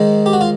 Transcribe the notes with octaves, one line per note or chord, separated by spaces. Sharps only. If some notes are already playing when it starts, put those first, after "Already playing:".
Already playing: G#2 D#3 G#3
G4
F#4
F4